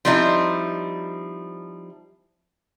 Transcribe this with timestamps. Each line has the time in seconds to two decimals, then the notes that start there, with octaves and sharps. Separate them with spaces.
0.05 F3 G3 C4 D#4 E4